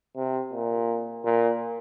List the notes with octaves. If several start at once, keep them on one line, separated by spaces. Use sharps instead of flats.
C3
A#2
A#2